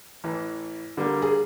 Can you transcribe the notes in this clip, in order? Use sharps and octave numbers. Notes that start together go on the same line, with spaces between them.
A1 E3
D3 G3 A#3
G#4